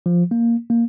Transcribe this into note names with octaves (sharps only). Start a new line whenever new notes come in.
F3
A#3
A#3